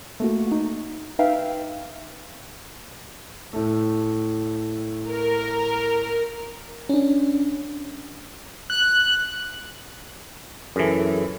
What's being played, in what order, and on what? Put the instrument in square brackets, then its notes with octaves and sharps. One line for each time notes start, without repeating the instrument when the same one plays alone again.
[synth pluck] A3 A#3 F#4
D#4 F#4
D#4 B4 E5 F5 G5
[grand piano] A2 A3
[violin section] A#4
[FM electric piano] C#4 D4
[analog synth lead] F#6
[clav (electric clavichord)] F#2 E3 [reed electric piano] G#4 A4